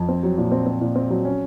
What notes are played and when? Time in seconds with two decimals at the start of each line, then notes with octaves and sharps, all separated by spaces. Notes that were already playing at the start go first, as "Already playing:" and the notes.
Already playing: F2
0.08 C4
0.23 F#3
0.38 A#2
0.52 C4
0.66 C4
0.81 A#2
0.96 C4
1.10 F#3
1.25 C#4